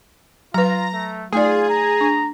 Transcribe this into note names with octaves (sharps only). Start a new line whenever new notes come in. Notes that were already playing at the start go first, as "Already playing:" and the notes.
F#3 F4 B4 A#5
A3
A3 D#4 F4 G#4 D5
A#5
D4